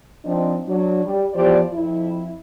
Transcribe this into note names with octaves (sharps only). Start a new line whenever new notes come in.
F3 C4 D4 D#4
F#3 D4
G3
E2 F3 G4 C5 D5
F2 E4